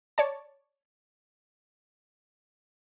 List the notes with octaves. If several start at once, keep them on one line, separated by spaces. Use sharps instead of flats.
C#5 D5 A5